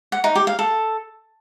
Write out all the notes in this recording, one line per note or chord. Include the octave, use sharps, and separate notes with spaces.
F#5
D#4
G4
F5
A4